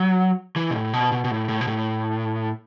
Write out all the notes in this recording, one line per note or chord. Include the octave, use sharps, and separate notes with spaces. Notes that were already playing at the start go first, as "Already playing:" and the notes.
Already playing: F#3
E3
B2
A2
B2
B2
B2
A2
A2
B2
A2